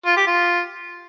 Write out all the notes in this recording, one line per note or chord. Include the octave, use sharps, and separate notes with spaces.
F4
G4
F4